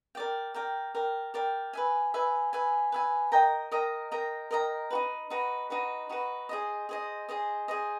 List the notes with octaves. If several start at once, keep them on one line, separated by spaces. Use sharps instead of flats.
A#4 D5 G5
A#4 D5 G5
A#4 D5 G5
A#4 D5 G5
B4 E5 G#5
B4 E5 G#5
B4 E5 G#5
B4 E5 G#5
A#4 D#5 G5 A#5
A#4 D#5 G5 A#5
A#4 D#5 G5 A#5
A#4 D#5 G5 A#5
D#4 F#4 B4
D#4 F#4 B4
D#4 F#4 B4
D#4 F#4 B4
G#4 C5 D#5
G#4 C5 D#5
G#4 C5 D#5
G#4 C5 D#5